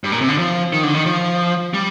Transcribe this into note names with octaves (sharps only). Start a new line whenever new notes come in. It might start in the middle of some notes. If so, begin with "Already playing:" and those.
G2
A#2
C3
D3
F3
D#3
D3
D#3
F3
G3